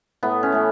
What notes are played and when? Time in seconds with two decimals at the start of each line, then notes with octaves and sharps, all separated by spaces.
0.23 A2 B3
0.43 C#4
0.52 E3 A3